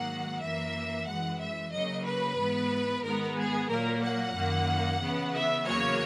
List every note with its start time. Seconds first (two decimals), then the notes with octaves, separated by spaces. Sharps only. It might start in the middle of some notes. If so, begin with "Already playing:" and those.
Already playing: G#2 D#3 F#3 A#3 F#5
0.41 F#2 E3 A#3 E5
1.06 F#2 E3 G#3 F#5
1.39 E5
1.72 C#3 F#3 A#3 D#5
2.04 B4
2.38 G#2 E3 B3
3.04 G#2 D#3 G#3 B3 A#4
3.37 G#4
3.69 A#2 F#3 A#3 A#4
4.02 F#5
4.35 F#2 D#3 A#3
5.01 C#3 E3 B3
5.34 E5
5.67 E2 C#3 F#3 A#3 C#5